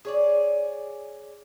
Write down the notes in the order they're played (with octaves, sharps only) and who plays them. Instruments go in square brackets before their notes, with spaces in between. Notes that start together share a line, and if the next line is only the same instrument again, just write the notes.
[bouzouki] G#4 C#5 D5